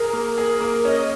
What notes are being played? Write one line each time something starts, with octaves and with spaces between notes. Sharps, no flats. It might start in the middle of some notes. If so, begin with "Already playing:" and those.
Already playing: G#4 A#4
A#3
G#4
A#3
C#4 D#5